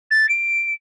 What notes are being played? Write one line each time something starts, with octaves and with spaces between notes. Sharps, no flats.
A6
D7